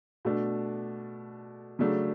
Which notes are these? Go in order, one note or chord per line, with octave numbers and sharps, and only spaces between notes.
B2 A3 D4
C#3 F#3 A3 D4